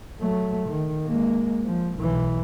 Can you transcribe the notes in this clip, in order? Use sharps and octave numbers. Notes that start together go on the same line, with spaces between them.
F#3 A3
D#3
G#3 A#3
F3
B1 E3